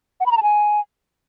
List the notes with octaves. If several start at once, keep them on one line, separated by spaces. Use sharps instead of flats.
F#5
B5
A#5
A5
G#5